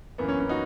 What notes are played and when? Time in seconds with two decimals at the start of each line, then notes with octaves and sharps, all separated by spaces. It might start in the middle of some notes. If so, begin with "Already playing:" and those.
0.18 F#2 E3 A#3 B3
0.29 C#4
0.39 C#4
0.49 D#4 F#4